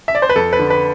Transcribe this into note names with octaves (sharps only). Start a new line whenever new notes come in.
E5
D5
C5
B4
F2 A4
B4
D3
B4